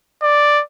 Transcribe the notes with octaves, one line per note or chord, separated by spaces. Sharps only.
D5